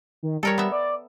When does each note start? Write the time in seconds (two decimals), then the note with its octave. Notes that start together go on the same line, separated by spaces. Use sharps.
0.23 D#3
0.43 G3 A4 A#4 C#5
0.58 B3 E5
0.72 D5